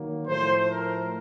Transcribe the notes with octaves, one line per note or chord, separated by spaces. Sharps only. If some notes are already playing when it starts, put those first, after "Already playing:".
Already playing: D#3 F#3 A#3
A2 F3 A3 C5
A#4